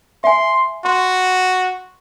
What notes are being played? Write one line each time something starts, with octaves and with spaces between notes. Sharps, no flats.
E5 G#5 C6
F#4 C6